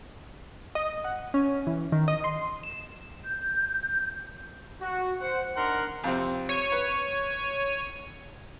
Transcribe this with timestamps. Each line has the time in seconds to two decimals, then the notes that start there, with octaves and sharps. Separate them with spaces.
0.75 D#5
1.04 F#5
1.34 C#4
1.67 E3
1.92 D#3
2.08 D#5
2.24 C6
2.63 E7
3.23 G6
4.81 F#4
5.20 C5 F#5
5.55 D4 D#4 A#4 F#5 C6
6.04 F2 C3 C4
6.49 C#5 D#7
6.72 B4